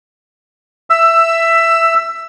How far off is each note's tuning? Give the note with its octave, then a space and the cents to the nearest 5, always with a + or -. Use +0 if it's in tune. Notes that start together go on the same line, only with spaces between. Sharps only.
E5 +10 E6 +20